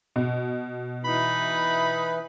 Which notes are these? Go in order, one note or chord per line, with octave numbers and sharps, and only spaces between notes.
B2
E3 D#4 E4 B4 B5